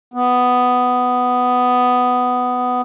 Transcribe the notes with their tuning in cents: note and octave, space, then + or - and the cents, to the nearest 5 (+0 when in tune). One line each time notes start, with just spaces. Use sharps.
B3 +10